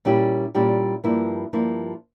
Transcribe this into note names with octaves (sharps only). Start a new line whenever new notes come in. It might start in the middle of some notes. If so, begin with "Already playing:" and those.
A#2 G3 C#4 E4 G4
A#2 G3 C#4 E4 G4
G2 F3 A#3 E4
G2 F3 A#3 E4